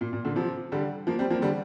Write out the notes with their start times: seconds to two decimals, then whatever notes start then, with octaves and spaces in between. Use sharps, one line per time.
0.01 A#2
0.13 A#2
0.25 A#2 D3
0.36 C3 F3
0.72 D3 G3
1.07 F3 A#3
1.19 G3 C4
1.30 F3 A#3
1.42 D3 G3